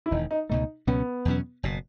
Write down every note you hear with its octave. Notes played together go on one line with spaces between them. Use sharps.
E4
E1 E2 D#3 D#4
D#4
C#2 B2 A3 D#4
C#2 B2 F#3 B3 C#4
E2 B2 F#3 C#4
F#1 B2